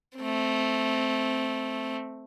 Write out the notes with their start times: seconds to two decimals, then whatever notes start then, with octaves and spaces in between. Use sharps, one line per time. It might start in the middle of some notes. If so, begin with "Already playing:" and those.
0.18 A3 C4